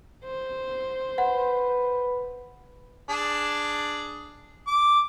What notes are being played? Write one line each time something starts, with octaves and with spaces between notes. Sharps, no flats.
C5
B4 F#5
D4 G#4 A5
D6